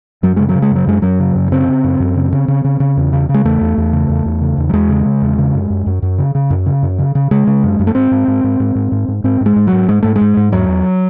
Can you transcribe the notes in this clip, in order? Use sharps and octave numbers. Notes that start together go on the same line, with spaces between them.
F#2 F#3
C#3 G#3
F#3
C#3
G#3
F#2 F#3
F#2 G#3
F#2 F#3
C#3
F#2
C#3 C4
C#3
F#2
F#2
C#3
C#3
C#3
C#3
C#3
E2
C#3
C#3
G#3
E2 A3
E2
E2
C#3
E2
E2
C#3
E2
F#3
E2 G#3
C#3
C#3
E2
C#3
F#2
F#2
F#2
F#2
C#3
C#3
F#2
C#3
F#2
C#3
C#3
C#3 G#3
C#3
F#2
F#2
A3
G#2 C4
G#2
G#2
G#2
G#2
G#2
G#2
G#2
G#2 C4
G#2
G#3
G#2
F#3
G#2
G#2 G#3
G#2 A3
G#3
G#2
G#2
E2 F#3
E2